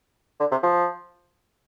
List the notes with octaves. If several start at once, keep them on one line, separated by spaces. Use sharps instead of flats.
D3
C3
F3